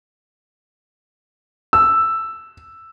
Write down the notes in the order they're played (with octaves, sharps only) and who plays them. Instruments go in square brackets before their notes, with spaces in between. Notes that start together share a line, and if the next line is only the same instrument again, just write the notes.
[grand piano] E6